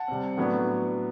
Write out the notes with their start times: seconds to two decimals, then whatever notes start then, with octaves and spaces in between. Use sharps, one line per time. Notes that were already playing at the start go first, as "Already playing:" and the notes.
Already playing: F#5 A5
0.08 C3 G3 C4
0.37 A2 F#3 B3 D4